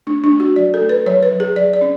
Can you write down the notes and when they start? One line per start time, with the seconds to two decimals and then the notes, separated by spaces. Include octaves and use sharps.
0.07 A3 D4
0.24 D4
0.32 A3
0.40 F#4
0.56 F#3 D5
0.74 A4
0.81 A3
0.89 B4
1.06 F#3 C#5
1.23 B4
1.31 F#3
1.40 G#4
1.56 F#3 D5
1.73 D5
1.81 C#4